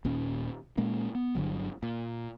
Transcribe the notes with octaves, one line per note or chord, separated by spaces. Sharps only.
D#1 A#2 C#4
A#2 G#3 A#3 C#4
B3
G1 D3 F#3
A#2